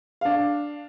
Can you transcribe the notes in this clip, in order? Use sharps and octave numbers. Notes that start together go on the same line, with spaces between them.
D4 F5